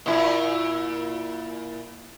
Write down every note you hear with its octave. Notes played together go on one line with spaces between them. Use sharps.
A#2 E4